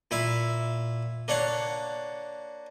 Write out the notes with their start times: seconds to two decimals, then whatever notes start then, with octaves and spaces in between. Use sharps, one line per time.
0.11 A#2 E4 E5 F5
1.28 A#3 D4 C#5 F5 F#5